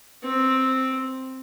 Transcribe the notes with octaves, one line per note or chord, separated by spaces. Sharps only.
C4